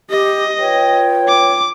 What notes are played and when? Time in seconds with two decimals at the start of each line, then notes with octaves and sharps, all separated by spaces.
0.10 G4 D#5
0.60 F4 B4 C#5 G5
1.28 D6